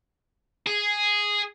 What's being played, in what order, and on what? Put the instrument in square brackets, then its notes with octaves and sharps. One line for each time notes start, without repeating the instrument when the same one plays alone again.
[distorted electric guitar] G#4